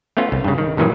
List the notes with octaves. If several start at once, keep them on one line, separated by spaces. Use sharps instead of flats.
A3 B3 C#4 F4
C2
G2 C#3
D#3
G2 A#2 D#3 E3 F#3 G#3